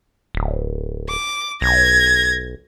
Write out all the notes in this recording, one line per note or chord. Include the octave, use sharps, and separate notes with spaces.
D1
D6
B1 G#6 A#6